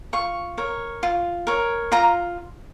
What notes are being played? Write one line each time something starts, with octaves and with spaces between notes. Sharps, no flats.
F4 C#6
A#4 C#5
F4
A#4 C#5
F4 A#5